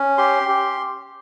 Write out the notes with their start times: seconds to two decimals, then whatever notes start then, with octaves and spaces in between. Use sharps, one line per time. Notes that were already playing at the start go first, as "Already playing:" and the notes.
Already playing: C#4
0.18 G4 C6
0.48 G4